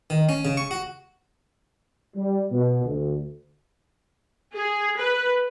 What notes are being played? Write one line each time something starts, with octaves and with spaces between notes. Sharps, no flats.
D#3
C#4
C#3
C#6
F#4
G3
B2
D2
G#4
B4